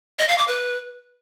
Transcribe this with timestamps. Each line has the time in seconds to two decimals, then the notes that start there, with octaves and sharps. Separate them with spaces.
0.19 D#5
0.29 F5
0.38 D6
0.48 B4